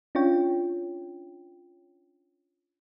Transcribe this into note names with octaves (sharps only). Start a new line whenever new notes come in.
C#4 D4 F4 C#5 G5